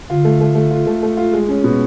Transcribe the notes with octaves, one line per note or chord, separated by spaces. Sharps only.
D3 F4
A3
A3
A3
F4
A3
A3
F4
G#3
C#4
B2